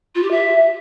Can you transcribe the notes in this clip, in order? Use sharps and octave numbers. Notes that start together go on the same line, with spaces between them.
F4
G4
E5